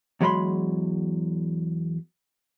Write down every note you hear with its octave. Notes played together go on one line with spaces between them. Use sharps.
E2 F#3 G#3 D5 B5 C6